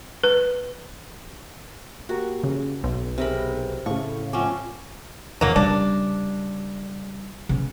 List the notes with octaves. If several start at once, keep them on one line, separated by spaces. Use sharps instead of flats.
B4
A#3 F#4 G4 A#4
C#3
B1 B2
C3 C4 G#4 A#4 B5
A2 C#3 F5 C#6
F3 C4 C#4 F#5 D6
E2 C#3 F#3 A#3
C#3 G3 D4
C#3 B3